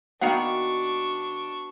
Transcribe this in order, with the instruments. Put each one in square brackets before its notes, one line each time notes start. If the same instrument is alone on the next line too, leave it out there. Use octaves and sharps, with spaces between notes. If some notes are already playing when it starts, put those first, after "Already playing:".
[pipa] D#3 F5 F#5 [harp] B3 F#4 [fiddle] D4 C#6